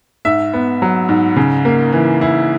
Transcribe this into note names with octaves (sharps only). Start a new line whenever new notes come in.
G#2 E5
B3
F#3
G#2
C#3
A#3
E3
E4